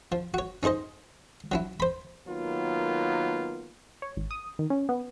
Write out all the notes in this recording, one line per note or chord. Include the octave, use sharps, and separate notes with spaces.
F3
F#4 C#5
C#4 D#4 G#4 C5 D#5
F#3 C#4 E4
C5 B5
D#3 F#3 A#3 B3 F4
C#5
G#1
D#6
D#3
C#4
B3